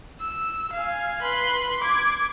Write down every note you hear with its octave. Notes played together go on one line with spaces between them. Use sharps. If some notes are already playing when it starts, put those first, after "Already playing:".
E6
F5 G#5
B4 C6
D6 G#6